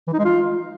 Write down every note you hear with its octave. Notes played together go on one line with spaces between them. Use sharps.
E3
D#4
G#3
F4